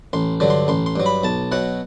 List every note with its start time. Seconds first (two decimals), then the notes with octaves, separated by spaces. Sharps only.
0.13 A1 C6
0.40 G2 D3 F#3
0.50 C6
0.68 A1 C6
0.86 C6
0.96 G2 F#3
1.06 B5
1.23 B1 A5
1.52 B2 F#3 F#5